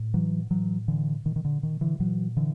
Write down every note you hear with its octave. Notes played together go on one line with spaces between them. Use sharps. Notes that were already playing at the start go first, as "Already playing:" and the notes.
Already playing: A2
E3 F#3
A2 E3 F#3
D3 E3
A#2 D#3
D#3
D3
D#3
D3 E3
A#2 E3 F#3
D3 E3